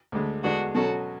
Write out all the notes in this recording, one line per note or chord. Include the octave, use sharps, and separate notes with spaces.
D2 D3 G#3 A3
E2 D3 G#3 B3 D4 F#4
B2 F#3 C#4 F#4 A4